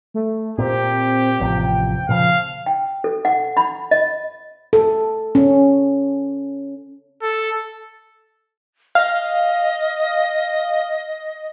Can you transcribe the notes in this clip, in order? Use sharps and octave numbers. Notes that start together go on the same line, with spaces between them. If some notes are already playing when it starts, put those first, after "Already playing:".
A3
A#2 C4 G4
A1 F2 C3 G5
A#2 C#3 F3 F5
G5
A4
F#5
B5
D#5
A4
C#4
A4
D#5 F5